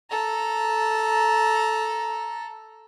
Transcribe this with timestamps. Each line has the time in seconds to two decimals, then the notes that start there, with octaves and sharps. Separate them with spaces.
0.10 A4 A#5